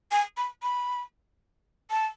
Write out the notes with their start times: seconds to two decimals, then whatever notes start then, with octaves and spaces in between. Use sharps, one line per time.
0.12 G#5
0.37 B5
0.63 B5
1.90 A5